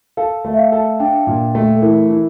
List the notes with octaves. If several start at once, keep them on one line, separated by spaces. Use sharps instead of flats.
A4 F5
A3
E5
F5
A4
D4 G5
A#2
A3
A4
E3 A#4
E3